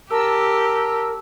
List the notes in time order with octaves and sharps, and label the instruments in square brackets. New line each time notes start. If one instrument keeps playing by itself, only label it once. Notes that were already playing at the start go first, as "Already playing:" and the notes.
[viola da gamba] G4 [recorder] A#4 [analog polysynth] A5 E6